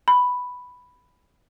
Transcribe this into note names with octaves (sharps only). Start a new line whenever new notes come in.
B5